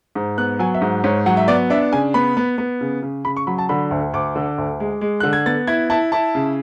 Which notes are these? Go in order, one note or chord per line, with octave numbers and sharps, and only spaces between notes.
G#2
B3 F#6
F#3 G#5
E5
G#2
G#2 C#5
F#3 F#5
E5
B3 D5
D4 E5
C#3 G#5
B3 B5
B3
B3
C#3
C#3
C#3 B5
C#6
F#3 B5
A5
D3 B5
D2
D2 D6
D3
D2
G#3
G#3
D3 F#6
G#6
B3 A6
E4 G#6
E4 A5
E4 A5
C#3